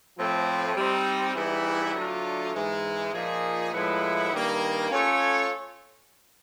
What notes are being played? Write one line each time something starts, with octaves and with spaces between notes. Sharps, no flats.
A2 F3 A3 C4
G3 C4 D#4
G#2 E3 G3 B3 E4
D3 F#3 A3 D4 F4
G#2 E3 G#3
A#2 F3 A#3 D#4 G#4
A2 F3 G#3 B3 E4
G2 D#3 G3 A#3
A3 C#4 F4 A4 C#5